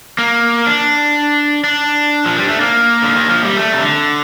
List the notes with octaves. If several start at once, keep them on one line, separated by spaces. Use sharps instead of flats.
A#3
D4
D4
F3
G3
A3
A#3
D3
D#3
F3
G3
A3
C3
D3